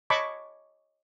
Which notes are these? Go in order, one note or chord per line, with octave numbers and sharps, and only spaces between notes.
C#5 D#5 A5 B5 C#6 D6